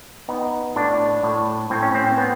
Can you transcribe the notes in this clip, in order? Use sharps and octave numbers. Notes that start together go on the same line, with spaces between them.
B3 D#4
A2 D4
A2
A2 C4
C#4
C4
B3 C4